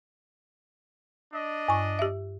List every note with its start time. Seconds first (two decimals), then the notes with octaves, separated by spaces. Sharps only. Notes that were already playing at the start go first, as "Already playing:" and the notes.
1.33 D4 D#5
1.68 G2 C#6
1.99 G4 E5